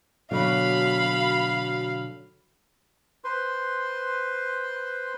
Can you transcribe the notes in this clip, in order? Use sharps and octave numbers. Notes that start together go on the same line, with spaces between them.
B2 D3 F#3 F5 B5
B4 C5 C6